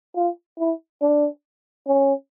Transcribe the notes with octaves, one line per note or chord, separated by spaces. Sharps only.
F4
E4
D4
C#4